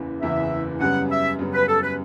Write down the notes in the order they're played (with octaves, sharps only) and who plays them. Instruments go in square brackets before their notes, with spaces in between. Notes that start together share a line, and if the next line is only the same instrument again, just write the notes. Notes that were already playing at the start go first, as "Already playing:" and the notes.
Already playing: [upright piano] F#1 E2 C#3 E3
[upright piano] F#1 E2 C#3 E3 [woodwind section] E5
[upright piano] F#2 C#3 G3 B3 [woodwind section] F#5
[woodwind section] E5
[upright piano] F#2 C#3 G3 B3
[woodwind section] B4
A4
B4